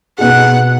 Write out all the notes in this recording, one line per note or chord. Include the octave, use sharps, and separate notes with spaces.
B2 B3 D#4 G#4 F#5